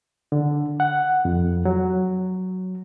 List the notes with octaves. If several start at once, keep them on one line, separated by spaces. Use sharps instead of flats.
D3
F#5
F2
F#3